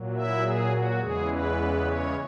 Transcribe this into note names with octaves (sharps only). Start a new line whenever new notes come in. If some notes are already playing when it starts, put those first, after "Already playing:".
Already playing: A#2 F#3
E4 E5
G#4
F#4
E2 C#3 E3 G#3 G#4
B3 B4
C#4 C#5